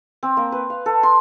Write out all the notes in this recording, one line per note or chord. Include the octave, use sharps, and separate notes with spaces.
C4
A#3
B4
F5
A4
C6